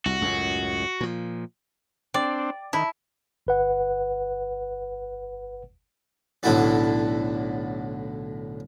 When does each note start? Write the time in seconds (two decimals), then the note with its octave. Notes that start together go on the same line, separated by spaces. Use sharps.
0.06 C2 F#4
0.22 C#2 F#2 A2
1.00 A#2 F3
2.14 C4 D4 D5 G5
2.73 D#3 E4 A5 B5
3.47 G1 B4 F#5
6.43 B1 A2 D3 E4 F#4 D5